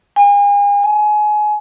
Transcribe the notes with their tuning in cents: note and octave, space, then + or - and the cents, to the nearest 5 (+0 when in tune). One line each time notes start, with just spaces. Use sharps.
G#5 -40
G#5 +25